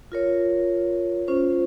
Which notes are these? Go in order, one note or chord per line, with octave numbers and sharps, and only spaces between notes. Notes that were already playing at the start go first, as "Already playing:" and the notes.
F4 A#4 C#5
C#4 F4 C5